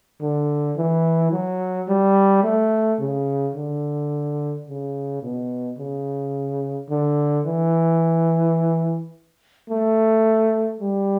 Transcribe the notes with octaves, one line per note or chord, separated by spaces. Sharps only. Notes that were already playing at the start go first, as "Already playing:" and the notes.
D3
E3
F#3
G3
A3
C#3
D3
C#3
B2
C#3
D3
E3
A3
G3